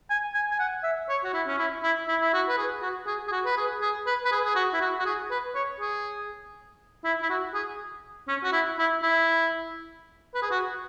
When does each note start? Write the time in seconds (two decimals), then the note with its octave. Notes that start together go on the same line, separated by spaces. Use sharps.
0.10 G#5
0.34 G#5
0.51 G#5
0.59 F#5
0.84 E5
1.09 C#5
1.24 F#4
1.34 E4
1.47 C#4
1.59 E4
1.84 E4
2.08 E4
2.21 E4
2.34 F#4
2.49 B4
2.58 G#4
2.82 F#4
3.07 G#4
3.28 G#4
3.32 F#4
3.46 B4
3.57 G#4
3.82 G#4
4.07 B4
4.25 B4
4.32 G#4
4.45 G#4
4.56 F#4
4.73 E4
4.81 F#4
4.99 F#4
5.06 G#4
5.31 B4
5.55 C#5
5.81 G#4
7.05 E4
7.22 E4
7.30 F#4
7.54 G#4
8.28 C#4
8.44 F#4
8.53 E4
8.79 E4
9.03 E4
10.35 B4
10.42 G#4
10.51 F#4